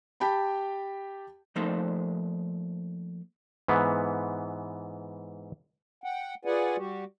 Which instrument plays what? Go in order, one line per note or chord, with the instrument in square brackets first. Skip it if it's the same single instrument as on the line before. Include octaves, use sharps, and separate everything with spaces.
[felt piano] G4 G5 A5 B5
[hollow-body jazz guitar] F3 A3 A#3 D#4 A4 C5
[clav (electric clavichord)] G#2 E3 B3
[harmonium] F#5 G5
F4 G#4 B4 D5 F#5 G#5
G3 F#4 G4